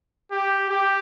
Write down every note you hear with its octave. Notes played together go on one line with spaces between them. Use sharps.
G4
G4